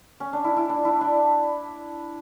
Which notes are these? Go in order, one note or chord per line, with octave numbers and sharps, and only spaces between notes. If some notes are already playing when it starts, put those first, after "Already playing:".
C#4
D4
E4
E4
D4
E4
D4